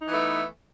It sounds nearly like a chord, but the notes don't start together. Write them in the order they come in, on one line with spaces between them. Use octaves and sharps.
D#4 E3 B3 A3